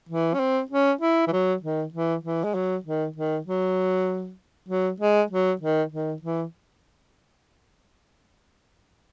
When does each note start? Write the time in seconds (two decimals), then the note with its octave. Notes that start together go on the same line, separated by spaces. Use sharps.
0.09 E3
0.34 C#4
0.40 C4
0.70 C#4
1.01 E4
1.28 E3
1.33 F#3
1.63 D#3
1.94 E3
2.24 E3
2.44 G#3
2.55 F#3
2.85 D#3
3.16 D#3
3.47 F#3
4.69 F#3
5.01 G#3
5.31 F#3
5.61 D#3
5.92 D#3
6.22 E3